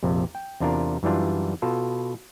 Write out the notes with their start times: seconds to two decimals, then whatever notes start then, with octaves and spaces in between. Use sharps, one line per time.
0.03 A#1 F2 C3
0.35 G5
0.60 E2 C3 D4 F4 A#4
1.03 F#2 E3 G3 D4 F4
1.62 B2 F4 A4